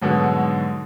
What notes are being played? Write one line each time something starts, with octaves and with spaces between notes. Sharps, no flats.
G#2 B2 D3 F#3